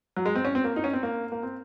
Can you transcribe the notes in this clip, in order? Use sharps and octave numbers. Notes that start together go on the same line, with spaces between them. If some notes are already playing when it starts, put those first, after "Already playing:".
F#3
G#3
C4
C#4
C4
A#3
D#4
C#4
C4
A#3
A#3
C4